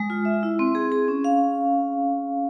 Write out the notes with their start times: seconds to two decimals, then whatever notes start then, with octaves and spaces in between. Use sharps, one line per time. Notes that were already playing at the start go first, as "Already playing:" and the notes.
Already playing: G#3
0.10 F4
0.25 E5
0.43 E4
0.59 C4
0.75 G#4
0.92 G#4
1.08 C#4
1.24 F5